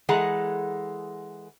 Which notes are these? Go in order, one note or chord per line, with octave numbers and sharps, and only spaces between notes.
E3 G#3 G#4 A4 F#5 A#5